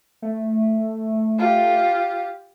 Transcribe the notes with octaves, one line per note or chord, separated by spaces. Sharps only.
A3
F4 G4